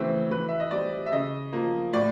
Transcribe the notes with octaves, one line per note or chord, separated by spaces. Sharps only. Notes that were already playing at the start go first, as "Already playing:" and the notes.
Already playing: C#3 E3 A3 C4
E3 B4
E5
D#5
G3 C4 D5
E5
C#3 D#5
F3 A#3
A2 D5